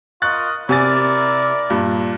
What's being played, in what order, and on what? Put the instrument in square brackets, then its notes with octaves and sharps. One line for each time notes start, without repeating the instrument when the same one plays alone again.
[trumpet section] F4 A#4 D#5 [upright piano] C#6 F#6 A6
[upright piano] C3 G#5 A6 [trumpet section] E4 A#4 D5
[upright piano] G2 A#2